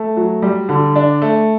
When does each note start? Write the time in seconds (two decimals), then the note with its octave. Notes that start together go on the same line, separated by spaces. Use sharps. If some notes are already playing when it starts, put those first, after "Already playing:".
Already playing: A3
0.16 F#3
0.42 G3
0.69 D3
0.96 D4
1.22 A3